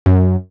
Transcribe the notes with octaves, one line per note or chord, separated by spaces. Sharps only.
F#2